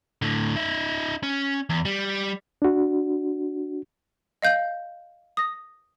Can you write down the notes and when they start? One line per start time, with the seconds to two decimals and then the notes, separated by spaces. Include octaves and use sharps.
0.22 A2 D3
0.56 D#4 E5
1.23 C#4
1.70 E2
1.85 G3
2.62 D4 F#4
4.42 D#5 F5 G6
5.37 D#6 A#6